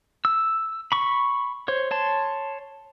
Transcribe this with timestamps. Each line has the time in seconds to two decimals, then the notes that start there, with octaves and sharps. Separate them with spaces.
0.25 E6
0.92 B5 C#6
1.68 C5 C#5
1.91 C#5 A5 C6